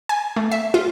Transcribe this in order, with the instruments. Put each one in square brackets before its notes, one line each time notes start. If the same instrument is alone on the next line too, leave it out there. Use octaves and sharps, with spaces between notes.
[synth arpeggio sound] G#5
A3
E5
F4